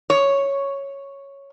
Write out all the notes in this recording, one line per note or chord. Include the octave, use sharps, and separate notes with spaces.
C#5